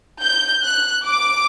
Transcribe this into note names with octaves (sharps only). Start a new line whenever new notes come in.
G6
F#6
D6